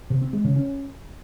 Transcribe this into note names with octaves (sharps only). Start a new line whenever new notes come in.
C3
C4
G#3
C#3
C#4